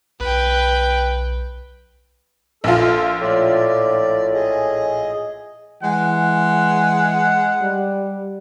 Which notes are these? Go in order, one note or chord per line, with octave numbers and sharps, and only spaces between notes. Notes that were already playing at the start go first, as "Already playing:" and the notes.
B1 B4 G5
A#1 F4 A4
A2 D5
G#4 D#5
E3 G#3 F#5
G3